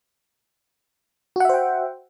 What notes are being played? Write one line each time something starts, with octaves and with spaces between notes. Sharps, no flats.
F#4 C5 E5 F#5 G5